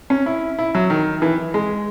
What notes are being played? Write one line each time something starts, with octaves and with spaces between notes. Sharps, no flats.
C#4
E4
E4
F#3
D#3
E3
G#3